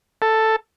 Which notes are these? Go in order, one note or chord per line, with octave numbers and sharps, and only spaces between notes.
A4